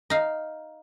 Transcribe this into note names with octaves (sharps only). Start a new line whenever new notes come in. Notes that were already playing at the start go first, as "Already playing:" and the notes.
D#4 F5